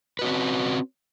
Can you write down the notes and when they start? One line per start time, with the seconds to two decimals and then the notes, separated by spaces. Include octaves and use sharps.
0.19 B4
0.22 F#4
0.24 C#4
0.27 C4